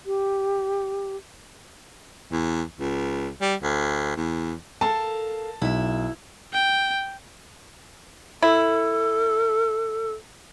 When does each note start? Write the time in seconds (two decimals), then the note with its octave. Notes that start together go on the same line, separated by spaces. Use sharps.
0.06 G4
2.32 E2
2.80 C#2
3.41 G3
3.63 D2
4.17 E2
4.81 A4 A#4 F5 A5
5.62 B1 E4 E5
6.53 G5
8.42 E4 A4